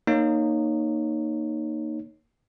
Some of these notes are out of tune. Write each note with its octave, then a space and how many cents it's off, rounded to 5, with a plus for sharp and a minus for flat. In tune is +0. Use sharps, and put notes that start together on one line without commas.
A#3 +0 D#4 -15 C#5 +0